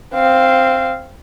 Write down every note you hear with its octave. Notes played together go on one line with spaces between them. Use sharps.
C4 F5